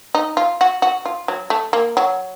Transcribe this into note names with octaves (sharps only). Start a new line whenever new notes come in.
D#4
F4
F#4
F#4
F4
F#3
A3
A#3
F#3